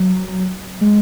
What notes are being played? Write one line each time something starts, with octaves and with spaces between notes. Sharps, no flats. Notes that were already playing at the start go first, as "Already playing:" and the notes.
Already playing: F#3
G#3